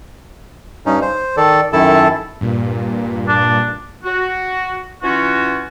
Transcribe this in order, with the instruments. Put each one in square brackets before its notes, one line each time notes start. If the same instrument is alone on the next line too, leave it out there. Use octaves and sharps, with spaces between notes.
[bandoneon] G2 C#4 D#4
C5
D#3 A4 D5
F#2 D#3 E4 A4 A5
[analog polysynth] G2 A#2
[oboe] D4
[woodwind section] F#4
E3 C#4 F4 F#4